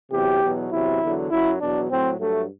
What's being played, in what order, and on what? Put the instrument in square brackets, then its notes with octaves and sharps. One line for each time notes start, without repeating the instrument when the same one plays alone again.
[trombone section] E2 C3 F#3 G4
E2 B2 F#3
E2 C3 F#3 E4
E2 D3 F#3
F#2 F#3 E4
E2 B2 F#3 D4
A2 F#3 C4
G2 F#3 A3